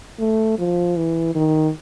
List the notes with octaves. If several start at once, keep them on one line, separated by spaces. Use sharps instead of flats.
A3
F3
E3
D#3